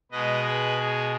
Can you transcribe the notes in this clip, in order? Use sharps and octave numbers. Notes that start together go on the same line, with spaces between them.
B2 G#3 B4 D#5
G#4 B4
G#4